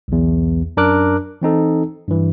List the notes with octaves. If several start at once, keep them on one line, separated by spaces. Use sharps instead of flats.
B1 E2
F#2 D4 A#4 D6 F#6
E3 C4 D#4 A4
G2 E3